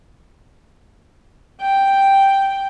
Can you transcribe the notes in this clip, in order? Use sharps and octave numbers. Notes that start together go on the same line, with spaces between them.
G5